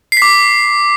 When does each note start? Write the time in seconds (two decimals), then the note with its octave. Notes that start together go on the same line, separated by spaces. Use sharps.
0.12 C7
0.17 B6
0.22 D6